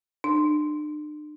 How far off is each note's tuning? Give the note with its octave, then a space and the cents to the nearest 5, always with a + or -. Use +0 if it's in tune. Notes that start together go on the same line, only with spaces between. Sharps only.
D4 +40